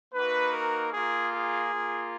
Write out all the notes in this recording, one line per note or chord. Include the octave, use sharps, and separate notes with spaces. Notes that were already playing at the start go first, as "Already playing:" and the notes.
A#3 D#4 F#4 B4
A#4
A#3 F4 G#4
G#4
A#3 F4